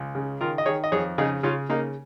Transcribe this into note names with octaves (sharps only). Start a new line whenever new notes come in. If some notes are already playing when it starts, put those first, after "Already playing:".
Already playing: C#2
C#3
D#3 F4 A#4
D#5
D#3 G#4 C#5
D#5
F2 G#4 C#5
C#3 D#4 G#4
C#3 C#4 F4
C#3 A#3 D#4